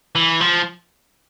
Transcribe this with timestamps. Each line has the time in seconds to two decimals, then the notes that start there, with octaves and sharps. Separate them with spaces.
0.16 E3
0.41 F3